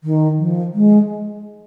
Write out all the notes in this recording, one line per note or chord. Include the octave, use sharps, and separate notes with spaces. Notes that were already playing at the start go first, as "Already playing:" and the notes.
D#3
F3
G#3